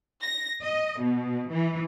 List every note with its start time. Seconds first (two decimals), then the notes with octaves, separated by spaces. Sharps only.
0.21 A#6
0.62 D#5
1.01 B2
1.51 E3